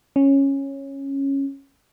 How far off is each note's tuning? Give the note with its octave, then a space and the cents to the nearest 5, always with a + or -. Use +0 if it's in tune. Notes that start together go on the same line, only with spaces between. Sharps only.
C#4 -10